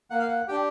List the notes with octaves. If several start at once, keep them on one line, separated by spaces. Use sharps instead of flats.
A#3 F#5
F5
F#5
D4 G4 G5